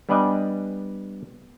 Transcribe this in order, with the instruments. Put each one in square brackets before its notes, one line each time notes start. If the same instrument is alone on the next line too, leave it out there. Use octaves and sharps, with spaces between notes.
[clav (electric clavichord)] G3 B3 D4 D5 D#5 G#5